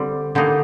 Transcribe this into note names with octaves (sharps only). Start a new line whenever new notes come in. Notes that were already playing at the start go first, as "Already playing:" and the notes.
Already playing: D3 G3 C4
D3 G3 A#3 D#4